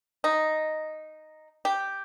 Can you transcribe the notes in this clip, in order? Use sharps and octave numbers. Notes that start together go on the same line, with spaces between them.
D#4
G4